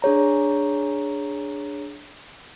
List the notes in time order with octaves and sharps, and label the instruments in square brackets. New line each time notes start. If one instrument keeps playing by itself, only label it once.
[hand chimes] D4 G#4 C#5 A#5